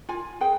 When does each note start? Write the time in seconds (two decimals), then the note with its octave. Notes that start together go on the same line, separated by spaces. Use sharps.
0.09 F4 G#5
0.41 G#4 B4 G5